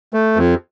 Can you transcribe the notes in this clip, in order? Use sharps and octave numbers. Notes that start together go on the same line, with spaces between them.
A3
F2